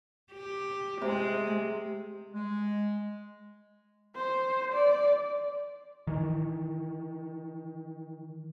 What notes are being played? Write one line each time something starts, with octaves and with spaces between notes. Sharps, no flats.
G4
C3 G#3
G#3
C5
D5
D#3 E3